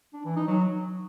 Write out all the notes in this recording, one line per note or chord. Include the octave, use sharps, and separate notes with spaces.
D4
E3
D#4
F#3